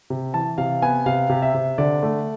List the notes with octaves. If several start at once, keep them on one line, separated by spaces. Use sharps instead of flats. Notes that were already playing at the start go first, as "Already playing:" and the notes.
C3
E3 A5
C3 F5
B3 G#5
C3 F5
C3
E5
C3
D3 D5
A3